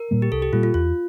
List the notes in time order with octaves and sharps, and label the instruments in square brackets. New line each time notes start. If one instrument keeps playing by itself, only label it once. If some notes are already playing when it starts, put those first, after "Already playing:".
Already playing: [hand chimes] A#4
[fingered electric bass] A#2 G3 A#3
[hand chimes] G4
[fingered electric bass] C2 [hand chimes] A4
[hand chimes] G4
[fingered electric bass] A#2 G3 A#3 [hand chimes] F4
[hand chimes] F4
[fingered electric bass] E2 [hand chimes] F4